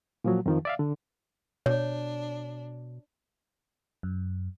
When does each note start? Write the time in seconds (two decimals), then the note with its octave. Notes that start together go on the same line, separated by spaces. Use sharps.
0.24 A#2 F3 F#3
0.46 F2 D#3 F3
0.65 D5 E5 F5
0.79 D3
1.66 B2 D4 C#5
4.03 F#2